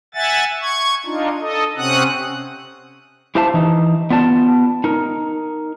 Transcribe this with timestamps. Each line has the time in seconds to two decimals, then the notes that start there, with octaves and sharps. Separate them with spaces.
0.15 E5 F#5 G#5 A6
0.61 C#6 G#6
1.05 D4 D#4 F4
1.40 A4 D#5
1.78 C3 C4 C#4 F#5 D#6 F#6
3.35 E4 G4 C5 E5 F5 A5
3.54 E3 D#4
4.10 B3 F4 D5 A5
4.84 D#4 A#4